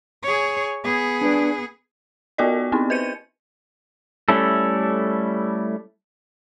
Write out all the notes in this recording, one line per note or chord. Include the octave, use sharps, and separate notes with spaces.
G#4 C#5
B3 G#4
D4 B4 D5
B3 F4 F#4 A#4 D5 D#5
B3 C4 D#4 E4
B4 C5 G6 C#7 D#7
G3 A3 C#4 E4 A4